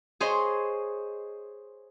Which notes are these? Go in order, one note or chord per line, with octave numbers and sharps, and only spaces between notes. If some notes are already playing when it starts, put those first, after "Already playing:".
G#4 C5 C#5 D#5